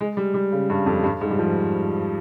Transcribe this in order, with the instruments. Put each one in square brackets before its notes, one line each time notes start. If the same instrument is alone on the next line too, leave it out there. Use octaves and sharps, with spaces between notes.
[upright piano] G#3
G3
G3
C#3
G2
F2
G2
G#2
G3
F3